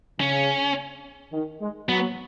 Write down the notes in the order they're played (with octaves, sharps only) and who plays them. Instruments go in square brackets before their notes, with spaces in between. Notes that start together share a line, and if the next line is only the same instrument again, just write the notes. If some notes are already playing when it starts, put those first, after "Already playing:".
[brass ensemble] C#3 [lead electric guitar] C#4
[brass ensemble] D#3
G#3
[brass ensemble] F#3 [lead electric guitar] B3